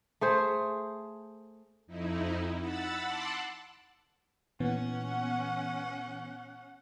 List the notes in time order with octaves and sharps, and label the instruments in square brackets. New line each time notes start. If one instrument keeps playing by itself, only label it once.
[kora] A3 G#4 C5
[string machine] F2 D#4 E4
F#5 B5 E6 A6
F#5 A5 C6 D6 E6 F#6
[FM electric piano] A#2 E3 B3 [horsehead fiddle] C#4 F#5